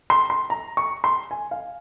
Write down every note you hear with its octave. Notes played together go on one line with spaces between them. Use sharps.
C6
C6
A#5
C#6
C6
G#5
F5